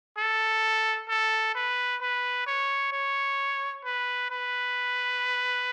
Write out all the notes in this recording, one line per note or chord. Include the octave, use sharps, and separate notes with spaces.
A4
A4
B4
B4
C#5
C#5
B4
B4